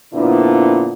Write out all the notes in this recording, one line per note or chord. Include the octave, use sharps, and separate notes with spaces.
F2 A#2 D3 B3 D4 E4